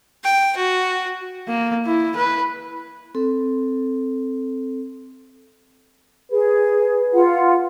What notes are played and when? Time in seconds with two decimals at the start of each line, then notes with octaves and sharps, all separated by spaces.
0.24 G5
0.56 F#4
1.48 A#3
1.86 E4
2.16 B4
3.15 C4 A4
6.31 G#4 B4
7.13 F4 F#5